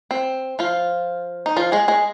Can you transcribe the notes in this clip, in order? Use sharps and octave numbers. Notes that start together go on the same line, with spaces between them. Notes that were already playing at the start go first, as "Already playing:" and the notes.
C4
F3 F4
D#4
F3 F4
G#3 G#4
G#3 G#4